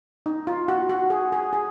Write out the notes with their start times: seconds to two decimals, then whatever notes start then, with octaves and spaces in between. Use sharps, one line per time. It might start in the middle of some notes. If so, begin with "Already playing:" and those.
0.26 D#4
0.47 F4
0.68 F#4
0.89 F#4
1.10 G#4
1.32 G#4
1.53 G#4